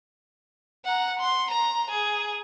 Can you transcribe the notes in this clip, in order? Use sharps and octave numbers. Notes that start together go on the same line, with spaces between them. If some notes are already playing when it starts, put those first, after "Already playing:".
F#5 A#5
C6
A#5
G#4